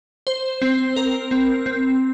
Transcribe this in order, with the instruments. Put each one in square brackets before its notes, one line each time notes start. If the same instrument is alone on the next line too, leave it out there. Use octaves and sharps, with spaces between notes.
[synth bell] C5
C4
A#4
C4
C4